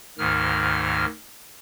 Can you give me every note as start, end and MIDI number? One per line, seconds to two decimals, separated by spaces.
0.18 1.06 38
0.18 1.06 44
0.18 1.06 51
0.18 1.06 89